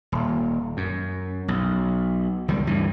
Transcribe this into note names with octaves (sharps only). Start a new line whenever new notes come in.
D#1
F#2
B1
C#2 D#3 G3
D2 G2 E3